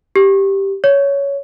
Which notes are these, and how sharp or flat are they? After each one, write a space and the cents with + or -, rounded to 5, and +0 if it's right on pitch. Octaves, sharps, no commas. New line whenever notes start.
G4 +0
C#5 +10